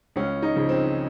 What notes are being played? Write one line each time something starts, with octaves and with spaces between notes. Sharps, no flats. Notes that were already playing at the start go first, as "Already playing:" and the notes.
C#2 C#4
D#4
C#3 F3
C4